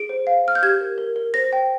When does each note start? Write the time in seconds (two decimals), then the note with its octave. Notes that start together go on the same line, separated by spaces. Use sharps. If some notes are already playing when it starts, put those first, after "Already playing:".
Already playing: G#4 D7
0.09 C5
0.27 F5
0.45 F5 F6
0.55 G6
0.63 G4 G#6
0.81 A#4
0.98 A#4
1.16 A#4
1.34 C5 A#6
1.53 G5